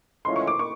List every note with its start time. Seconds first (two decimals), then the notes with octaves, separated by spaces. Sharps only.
0.25 A2 E3 G#3 C#4 F4 C6
0.36 C#6
0.47 D6
0.59 C#6